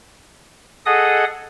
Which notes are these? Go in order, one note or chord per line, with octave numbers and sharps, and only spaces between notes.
G#4 A4 D#5 F#5 D#6